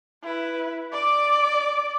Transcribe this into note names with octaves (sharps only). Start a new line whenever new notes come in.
E4 B4
D5 D6